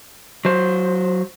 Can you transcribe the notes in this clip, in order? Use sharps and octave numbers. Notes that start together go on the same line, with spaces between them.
F#3 C5